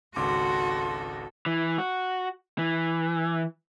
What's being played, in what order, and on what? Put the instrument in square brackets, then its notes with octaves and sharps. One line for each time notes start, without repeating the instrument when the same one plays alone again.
[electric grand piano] G#1 C#2 D6 [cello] F#4 [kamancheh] A4 [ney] C6
[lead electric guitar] E3
F#4
E3